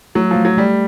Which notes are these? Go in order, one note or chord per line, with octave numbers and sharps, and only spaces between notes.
F#3 A3
F3
A3
F#3
G3 A3